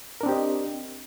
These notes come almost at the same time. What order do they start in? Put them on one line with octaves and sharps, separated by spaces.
A#4 D4 C4 G4 D#5